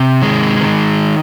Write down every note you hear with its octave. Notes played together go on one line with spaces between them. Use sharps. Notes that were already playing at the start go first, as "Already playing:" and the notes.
Already playing: C3
D#3 G#3
D#3